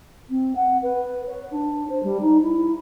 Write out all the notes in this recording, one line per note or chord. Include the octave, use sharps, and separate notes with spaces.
C4
F#5
B4
C#5
D4
C5
G3
D#4
E4